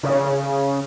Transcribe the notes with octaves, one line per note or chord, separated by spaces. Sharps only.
C#3